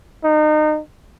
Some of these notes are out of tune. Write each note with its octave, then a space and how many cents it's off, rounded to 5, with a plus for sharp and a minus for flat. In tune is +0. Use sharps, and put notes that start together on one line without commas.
D#4 -30